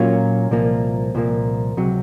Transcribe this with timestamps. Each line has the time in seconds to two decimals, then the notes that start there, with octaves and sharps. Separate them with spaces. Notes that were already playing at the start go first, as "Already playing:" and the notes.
Already playing: A#2 F#3 A#3 C#4 F4
0.51 C2 A#2 F3 A#3
1.15 C2 A#2 F3 A#3
1.77 C#2 C3 F#3